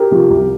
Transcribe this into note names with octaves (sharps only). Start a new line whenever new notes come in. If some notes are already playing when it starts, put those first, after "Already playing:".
Already playing: G4 A#4
C3 F3
C2